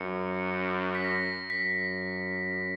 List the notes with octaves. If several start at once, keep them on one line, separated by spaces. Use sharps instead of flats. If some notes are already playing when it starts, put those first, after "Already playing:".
Already playing: F#2 C#7
B6
A#6
F#2 B6